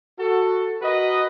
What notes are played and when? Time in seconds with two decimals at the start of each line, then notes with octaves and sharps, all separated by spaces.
0.19 F#4 A4
0.82 F#4 A#4 B4 D#5